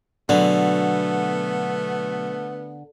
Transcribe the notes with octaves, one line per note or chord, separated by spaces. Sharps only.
B2 D3 F#3 A3 B3 G#4